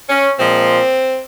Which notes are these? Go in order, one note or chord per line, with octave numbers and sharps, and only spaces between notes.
C#4
A#2 F3 G#3 C4